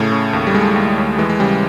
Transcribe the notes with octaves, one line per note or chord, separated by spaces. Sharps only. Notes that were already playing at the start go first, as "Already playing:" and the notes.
Already playing: A2 C#3 A3
C#3
D#2
G3
D#2 G#3
D#2
D#2
E3 G#3
G#3
C#3 G3